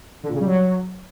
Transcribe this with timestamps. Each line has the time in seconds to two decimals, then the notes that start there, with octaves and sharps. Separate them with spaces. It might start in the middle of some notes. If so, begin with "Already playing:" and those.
0.23 D3
0.29 A#2
0.35 C#3
0.40 G3
0.46 F#3